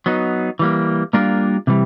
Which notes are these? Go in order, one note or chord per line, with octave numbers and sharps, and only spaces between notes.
F#3 B3 D#4
E3 G3 A#3
G3 A#3 D4 F4 A#4
C3 E3 G3